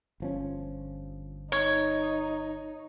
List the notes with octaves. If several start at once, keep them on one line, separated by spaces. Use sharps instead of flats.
G1 F3 C#4
D#4 C#5